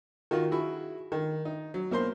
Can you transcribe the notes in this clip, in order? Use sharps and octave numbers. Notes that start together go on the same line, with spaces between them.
D#3 F4 F#4
E4 F#4 G#4
D#3
D#4
F#3
B1 A#3 C5 C6